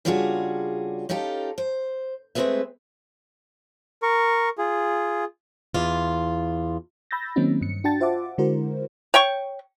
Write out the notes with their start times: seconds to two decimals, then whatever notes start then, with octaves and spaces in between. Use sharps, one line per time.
0.05 C#3 G3 D4 F4 F#4 G#4
1.09 C#4 D#4 F4 G4 A4
1.58 C5
2.35 G#3 A3 C4 G#4 B4 E5
4.03 A#4 C#6
4.58 F4 G#4
5.74 E2 F4
7.11 B5 E6 G6 A6 A#6
7.36 D#3 F#3 A#3 C4 C#4 D#4
7.61 G2 C#7
7.84 D4 F#4 G5 A5 A6
8.00 F4 C5 E5 F#5 D6
8.38 D3 G#3 E4 F#4 A#4 C5
9.14 C#5 G5 C#6